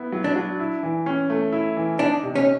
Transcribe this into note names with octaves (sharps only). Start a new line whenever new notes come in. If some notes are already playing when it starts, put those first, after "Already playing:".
Already playing: B3 E4
F#3
D4
F#3
E4
E3
C#4
A3
E4
E3
D4 D#4
C3
C#4